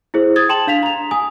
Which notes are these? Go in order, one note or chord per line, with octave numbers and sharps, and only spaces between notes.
E4 G#4 C5
D#6 G#6 A6
G5 A5 C6 E7 F#7
D4 F5 B6 F7
A#5 F7
G#5 D#6